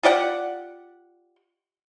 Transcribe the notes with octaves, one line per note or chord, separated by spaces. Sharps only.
F4 G4 D5 F#5